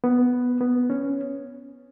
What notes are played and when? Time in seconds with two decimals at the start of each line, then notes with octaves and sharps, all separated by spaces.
0.04 B3
0.61 B3
0.90 C#4